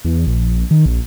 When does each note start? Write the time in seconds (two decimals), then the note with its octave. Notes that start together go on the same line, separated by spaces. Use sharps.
0.05 E2
0.27 A#1
0.71 D#3
0.86 A#1